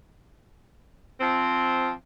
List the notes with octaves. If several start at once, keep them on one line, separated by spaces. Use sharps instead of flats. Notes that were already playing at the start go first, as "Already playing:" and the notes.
F3 C4